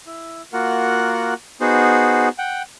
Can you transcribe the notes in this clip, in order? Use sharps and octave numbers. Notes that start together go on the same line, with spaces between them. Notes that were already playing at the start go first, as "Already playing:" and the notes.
E4
A#3 F4 F#4 A#4 F#5
B3 D#4 F#4 G#4 C5
F#5 G5